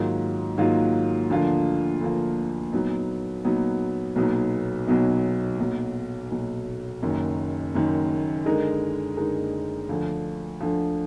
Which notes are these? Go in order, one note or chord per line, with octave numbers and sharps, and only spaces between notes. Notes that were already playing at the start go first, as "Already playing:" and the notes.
Already playing: G#2 D#3 F#3 A#3 F4
G#2 D#3 F#3 A#3 F4
D2 D3 F3 A#3 F4
D2 D3 F3 A#3 F4
A#2 F#3 B3 D#4
A#2 F#3 B3 D#4
B1 A#2 F#3 B3 D#4
B1 A#2 F#3 B3 D#4
B1 A#2 F#3
B1 A#2 F#3
F#1 F#2 D#3
F#1 F#2 D#3
D3 G#3 D#4 A#4
D3 G#3 D#4 A#4
D2 D3 F3
D2 D3 F3